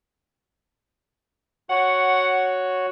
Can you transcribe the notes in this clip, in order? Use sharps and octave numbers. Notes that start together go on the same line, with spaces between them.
F#4 C#5 F#5